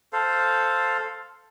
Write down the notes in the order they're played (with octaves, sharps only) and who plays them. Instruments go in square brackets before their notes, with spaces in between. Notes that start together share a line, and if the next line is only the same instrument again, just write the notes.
[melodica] A4 C5 F5